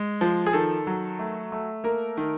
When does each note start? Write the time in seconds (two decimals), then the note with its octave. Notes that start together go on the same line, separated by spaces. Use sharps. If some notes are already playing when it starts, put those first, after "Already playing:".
Already playing: G#3
0.21 F3
0.46 G#4
0.53 D#3 A4
0.87 F#3
1.19 A3
1.52 A3
1.84 A#3 A#4
2.17 D#3